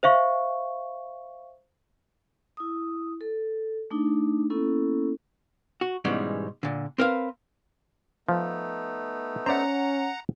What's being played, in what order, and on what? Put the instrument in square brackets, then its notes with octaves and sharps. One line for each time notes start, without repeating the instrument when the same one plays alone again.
[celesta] C5 E5 F5 C#6
[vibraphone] E4 D#6
A4
A3 D4 D#4
A#3 B3 C#4 E4 A4
[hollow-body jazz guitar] F#4
G#2 B2 E3 G3 G#3 C#4
A#2 D3
C4 A#4 B4 F5
[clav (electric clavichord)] F3 [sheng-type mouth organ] A3 B3 D#4
[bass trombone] C#4 [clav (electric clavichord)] C5 D5 E5 [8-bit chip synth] F#5 A#5